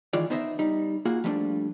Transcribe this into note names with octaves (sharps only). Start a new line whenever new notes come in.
D#3 E3 G#3 F4 D5
B3 D#4 C5 D#5 E5
G3 D#4
A#3 F4 F#4 G#4
F3 G3 A3 D4